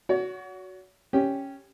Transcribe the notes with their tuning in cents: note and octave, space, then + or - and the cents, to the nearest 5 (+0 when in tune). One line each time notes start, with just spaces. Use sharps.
F#4 +0 C#5 +40
C#4 +0 G4 +0